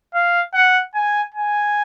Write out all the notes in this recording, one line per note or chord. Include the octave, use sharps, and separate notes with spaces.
F5
F#5
G#5
G#5